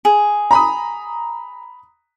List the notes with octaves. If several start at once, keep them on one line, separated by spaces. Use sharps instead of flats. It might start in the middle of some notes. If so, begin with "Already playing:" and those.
G#4
A#5 B5 D#6